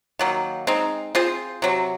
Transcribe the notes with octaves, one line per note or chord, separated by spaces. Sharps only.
D#3 F#3 A#3
G#3 C4 D#4
C4 F4 G#4 C5
C3 F#3 C4